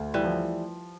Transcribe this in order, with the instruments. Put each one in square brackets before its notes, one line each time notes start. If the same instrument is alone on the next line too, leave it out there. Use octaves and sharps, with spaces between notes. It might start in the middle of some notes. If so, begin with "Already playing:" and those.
Already playing: [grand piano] D2 A3
[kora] E3 G3
[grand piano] F3